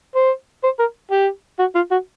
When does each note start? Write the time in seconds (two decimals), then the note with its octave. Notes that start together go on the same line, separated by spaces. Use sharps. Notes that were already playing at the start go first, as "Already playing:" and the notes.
0.16 C5
0.64 C5
0.79 A#4
1.11 G4
1.59 F#4
1.75 F4
1.91 F#4